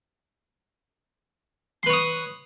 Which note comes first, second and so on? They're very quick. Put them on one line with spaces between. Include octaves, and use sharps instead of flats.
C6 B4 C#5 D#6